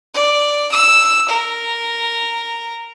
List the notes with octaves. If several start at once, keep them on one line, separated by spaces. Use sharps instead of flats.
D5
E6
A#4